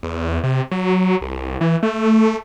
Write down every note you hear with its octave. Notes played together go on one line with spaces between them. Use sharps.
E2
C3
F#3
C2
E3
A3